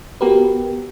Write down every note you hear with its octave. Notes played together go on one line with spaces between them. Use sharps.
B3 F#4 G4 A#4 B4